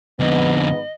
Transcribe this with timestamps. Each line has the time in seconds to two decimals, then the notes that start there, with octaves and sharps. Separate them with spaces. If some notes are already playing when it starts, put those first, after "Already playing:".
0.20 F2 G#2 D3 F3 B3 D#5